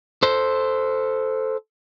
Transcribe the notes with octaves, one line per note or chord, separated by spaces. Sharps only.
A4 C5